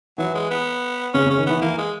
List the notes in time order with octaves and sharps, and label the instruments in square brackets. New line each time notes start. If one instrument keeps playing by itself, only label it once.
[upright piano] E3 [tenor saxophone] F#3
[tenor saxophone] G#3
B3
[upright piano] C#3 [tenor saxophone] C#4
[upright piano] C#3
[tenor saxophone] C#4
[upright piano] D#3
[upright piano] E3 [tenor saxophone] B3
[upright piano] E3 [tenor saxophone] A#3
[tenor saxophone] G#3